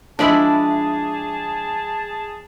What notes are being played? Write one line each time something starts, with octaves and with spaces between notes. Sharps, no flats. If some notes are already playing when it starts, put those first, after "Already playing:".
F3 G#3 D4 E4 G#4 D5 A5 B5